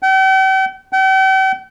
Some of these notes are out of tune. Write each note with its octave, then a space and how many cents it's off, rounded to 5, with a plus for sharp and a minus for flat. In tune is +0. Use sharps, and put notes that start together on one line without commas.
G5 -45
G5 -45